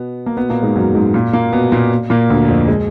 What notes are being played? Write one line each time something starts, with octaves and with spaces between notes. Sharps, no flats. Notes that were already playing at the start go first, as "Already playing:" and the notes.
Already playing: B2 B3
A#3
B2 B3
A#2 A#3
G#2 G#3
F#2 F#3
G#2 G#3
A#2 A#3
A#2 A#3
B2 B3
A#2 A#3
A#2 A#3
D2 D3
F2 F3
G#3